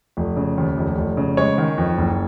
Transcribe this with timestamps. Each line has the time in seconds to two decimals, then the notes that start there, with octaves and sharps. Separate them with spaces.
0.17 F1
0.37 C#3
0.57 D#2
0.77 F1
0.97 F1
1.17 C#3
1.37 G#3 C#5
1.58 D#3
1.78 F2
1.98 F#1